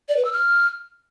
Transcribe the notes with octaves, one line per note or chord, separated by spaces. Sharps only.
D5
B4
E6
F6